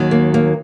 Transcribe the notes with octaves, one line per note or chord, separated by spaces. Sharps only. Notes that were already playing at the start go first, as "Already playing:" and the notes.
Already playing: D#2 D#3 F#3
A#3
A#3